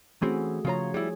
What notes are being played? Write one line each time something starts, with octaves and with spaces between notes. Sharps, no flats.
E3 A3 C4 C#4 F#4 G#4
C#3 F3 F4 C#5 A#5
G3 E4 G#4